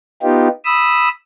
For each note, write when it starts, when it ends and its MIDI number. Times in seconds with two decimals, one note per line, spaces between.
0.23 0.48 59
0.23 0.48 63
0.23 0.48 65
0.23 0.48 67
0.65 1.09 83
0.65 1.09 87
0.65 1.09 88